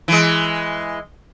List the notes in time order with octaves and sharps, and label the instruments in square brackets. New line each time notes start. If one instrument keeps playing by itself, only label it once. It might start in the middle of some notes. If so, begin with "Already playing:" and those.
[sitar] E3 G#3